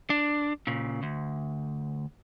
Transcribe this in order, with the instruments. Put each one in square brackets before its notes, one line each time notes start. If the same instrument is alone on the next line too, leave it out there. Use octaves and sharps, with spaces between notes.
[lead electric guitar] D4
A#2 C#3
D2